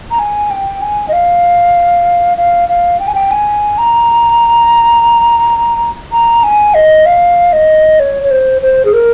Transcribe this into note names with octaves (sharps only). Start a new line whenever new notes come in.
A#5
G#5
G5
G#5
D#5
F5
F5
F5
G5
G#5
G5
G#5
A#5
A#5
G#5
D#5
F5
D#5
C#5
C#5
C5
C5
G#4
A#4